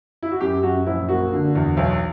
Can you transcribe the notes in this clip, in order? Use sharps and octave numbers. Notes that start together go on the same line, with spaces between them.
E4
F#4
F#2 G4
F#2 F#4
A#1 E4
A#3 F#4
D3
E2
B1